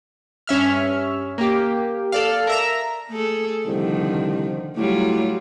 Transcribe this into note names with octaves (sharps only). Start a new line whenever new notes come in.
G2 C#4 E5 F6
A#3 G4
A4 D5 F5
A#4 E5 A#5
A3 G#4 A4
C2 D3 D#3 F3
A2 F#3 G3 F4